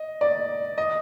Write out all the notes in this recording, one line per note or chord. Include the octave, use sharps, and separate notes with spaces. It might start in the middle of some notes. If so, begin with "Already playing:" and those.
Already playing: D#5
D5
D#5